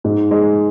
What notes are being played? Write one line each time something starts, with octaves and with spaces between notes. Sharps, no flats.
G#2
G#3